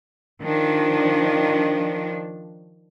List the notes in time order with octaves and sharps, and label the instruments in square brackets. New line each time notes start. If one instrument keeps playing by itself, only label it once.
[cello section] D#3 F3 D4